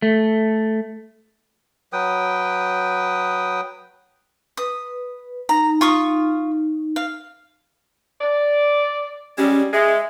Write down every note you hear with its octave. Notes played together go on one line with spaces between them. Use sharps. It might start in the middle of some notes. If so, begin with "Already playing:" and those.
A3
F#3 B4 G5 D#6
B4 D#6
D#4 A#5
F4 C#6 D#6
F5
D5
G3 G#3 C#4
G#3 E5